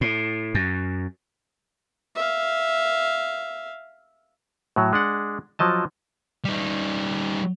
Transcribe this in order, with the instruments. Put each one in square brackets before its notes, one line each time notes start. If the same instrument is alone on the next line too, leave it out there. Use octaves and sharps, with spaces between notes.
[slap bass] A2
F#2
[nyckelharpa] E5 F5
[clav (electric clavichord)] A2 F#3
G#3 D4 F#5
F3 F#3 D#5 A5
[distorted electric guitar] G3 D#4